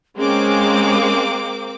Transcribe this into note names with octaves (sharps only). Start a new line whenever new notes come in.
G#3 A#3 C4 C#4 D6